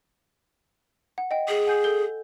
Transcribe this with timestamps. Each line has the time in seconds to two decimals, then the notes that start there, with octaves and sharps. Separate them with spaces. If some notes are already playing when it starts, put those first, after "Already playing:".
1.18 F#5
1.31 D#5 G5
1.48 G#4
1.67 F#5 G#5 G6
1.84 A4 G6 G7